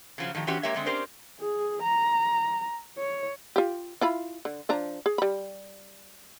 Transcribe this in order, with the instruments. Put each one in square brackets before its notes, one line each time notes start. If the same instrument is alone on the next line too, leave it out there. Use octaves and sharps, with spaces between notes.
[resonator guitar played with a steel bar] C#3 F3 F#3
A2 D#3 F3 G4
E3 C4 C#4 F#4 G4
G#3 A#3 G4 C#5 E5
D3 G#3 C4
C4 C#4 G4 A#4 C5 D5
[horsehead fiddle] G#4
A#5
C#5
[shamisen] F4 G4
E4 F4 B5
D3
F3 D4 A#5
G#4
G3 B5